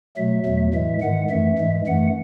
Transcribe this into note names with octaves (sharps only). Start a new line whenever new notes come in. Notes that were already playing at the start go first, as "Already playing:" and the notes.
B2 F#3 A3 E5
E2 B2 F#3 A3
A2 E3 G#3 E5
G#2 D#3 G#3 F#5
F#2 E3 A3 E5
G#2 E3 G#3
F#2 E3 A3 F#5